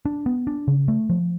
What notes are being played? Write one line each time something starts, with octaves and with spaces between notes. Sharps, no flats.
D4
B3
D4
C#3
A3
F3